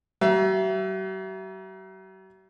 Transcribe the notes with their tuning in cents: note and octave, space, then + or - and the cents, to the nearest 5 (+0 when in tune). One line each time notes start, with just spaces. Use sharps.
F#3 +45 E5 +20